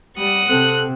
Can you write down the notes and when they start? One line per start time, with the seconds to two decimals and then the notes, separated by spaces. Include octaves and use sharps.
0.17 G3 F#5 D#6
0.49 C3 C4 A4 F#6